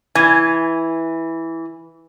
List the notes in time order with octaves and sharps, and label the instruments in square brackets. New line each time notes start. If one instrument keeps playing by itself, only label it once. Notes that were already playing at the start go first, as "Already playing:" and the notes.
[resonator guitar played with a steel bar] E3 [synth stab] G#5